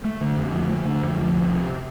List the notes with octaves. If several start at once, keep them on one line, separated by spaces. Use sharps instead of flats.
A3
D3
F2
F3
A3
D3
F2
F3
C2
C3